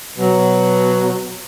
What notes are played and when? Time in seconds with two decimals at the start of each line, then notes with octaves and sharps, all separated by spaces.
0.18 B2 F#3